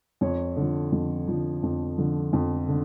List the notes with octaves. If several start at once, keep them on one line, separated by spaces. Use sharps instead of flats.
F2 C#5
D3 F3
F2
D3 F3
F2
D3 F3
F2
D3